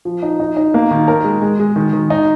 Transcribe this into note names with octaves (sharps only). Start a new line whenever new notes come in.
F3
D#4
D#4
D#4
A#3
D#3
A#4
G#3
G#3
G#3
D#3
D#3
D#4